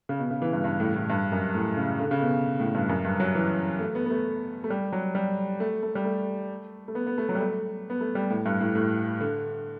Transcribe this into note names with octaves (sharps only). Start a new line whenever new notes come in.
C#3
B2
C#3
E3
G2
G2
A2
A2
G2
F#2
A2
C#3
D3
C#3
B2
A2
G2
F#2
G2
F#3
E3
A3
B3
B3
A3
A3
G3
F#3
G3
A3
A3
G3
A3
A3
B3
B3
A3
F#3
G3
A3
B3
A3
G3
A2
G2
A2
A2
D3